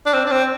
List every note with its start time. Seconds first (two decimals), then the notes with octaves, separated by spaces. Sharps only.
0.06 D4
0.14 C4
0.26 D4
0.32 C4